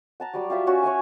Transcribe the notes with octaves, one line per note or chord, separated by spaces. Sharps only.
F#5 A5 A#5
F#3 G3 D5
F4 G4 E5 F5
C#4 F#4 C#5
C#5 E5 F#5 G#5